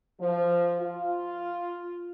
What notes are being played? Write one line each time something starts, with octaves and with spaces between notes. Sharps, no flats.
F3
F4